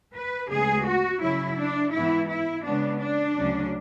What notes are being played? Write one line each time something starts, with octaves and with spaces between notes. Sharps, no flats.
B4
D2 C#3 G#3 B3 G#4
F#4
C#3 F#3 C#4 E4
D4
G#2 E3 B3 E4
E4
C#3 G#3 B3 D4
D4
D2 C#3 F#3 C#4